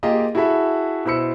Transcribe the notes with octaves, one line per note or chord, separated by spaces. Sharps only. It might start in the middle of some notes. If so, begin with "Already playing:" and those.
A#3 F4 G4 G#4 A#4 D#5
E4 F#4 G#4 A4 E5 B5
B2 E4 C5 B5 E6 C#7